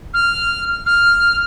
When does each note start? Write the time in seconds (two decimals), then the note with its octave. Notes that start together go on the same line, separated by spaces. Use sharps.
0.14 F6
0.86 F6